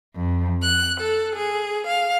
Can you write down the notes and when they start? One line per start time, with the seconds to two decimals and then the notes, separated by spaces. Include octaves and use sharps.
0.15 F2
0.61 F#6
0.98 A4
1.35 G#4
1.86 F5